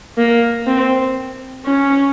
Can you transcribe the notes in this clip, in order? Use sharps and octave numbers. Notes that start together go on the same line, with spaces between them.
A#3
C4
C#4